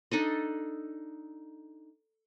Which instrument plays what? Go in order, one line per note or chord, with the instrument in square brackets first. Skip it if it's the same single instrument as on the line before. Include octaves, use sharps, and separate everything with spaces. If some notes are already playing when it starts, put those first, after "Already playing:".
[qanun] D4 D#4 A4 D#5